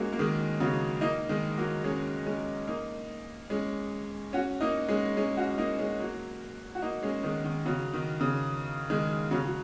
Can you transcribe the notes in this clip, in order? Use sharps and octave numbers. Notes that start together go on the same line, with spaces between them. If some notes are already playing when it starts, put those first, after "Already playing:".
Already playing: F#3 G#3 A#3 C#4
A#3
D#3 G#3
C#3 F#3
A#3 D#4
D#3 G#3
F#3 A#3
G#3 C#4
G#3 C#4
A#3 D#4
G#3 C#4
C#4 F#4
A#3 D#4
G#3 C#4
G#3 C#4
C#4 F#4
A#3 D#4
G#3 C#4
F#3 A#3
F#4
A#3 D#4
G#3 C#4
D#3 G#3
D#3
C#3 F#3
D#3
C#3
D#3 G#3
C#3 F#3
F#3